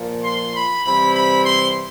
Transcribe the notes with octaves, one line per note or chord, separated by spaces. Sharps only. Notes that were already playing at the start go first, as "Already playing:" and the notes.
Already playing: A#2 F3 A#3
C6
B5
C3 E3 G3 C4 E4 B5
B5
C6